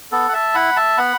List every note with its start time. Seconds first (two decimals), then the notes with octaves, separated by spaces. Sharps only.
0.12 B3 A4
0.29 F#5
0.33 E5 A5
0.55 E4 F#5 B5
0.76 E5 A5
0.98 B3 F#5 B5